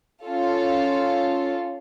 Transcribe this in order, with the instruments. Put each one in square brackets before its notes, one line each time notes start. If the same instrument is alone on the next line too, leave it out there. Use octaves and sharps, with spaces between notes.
[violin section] C#4 F4 A4